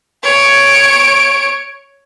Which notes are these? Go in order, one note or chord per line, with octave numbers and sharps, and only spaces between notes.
C#5 D7